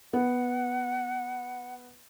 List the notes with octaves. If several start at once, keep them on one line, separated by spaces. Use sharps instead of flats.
B3 F#5